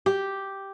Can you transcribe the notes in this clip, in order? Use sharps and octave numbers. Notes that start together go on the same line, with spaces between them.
G4